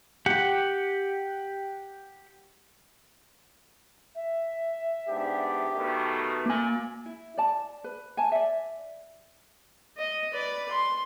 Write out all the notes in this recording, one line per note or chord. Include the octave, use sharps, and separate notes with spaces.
G4 F#5
E5
G#2 B3 D4 G4
B2 D#3 A3
A#3 G#5
E4
D5 A5
B4
G#5 A5
D5 E5
D#5
B4 D5
C6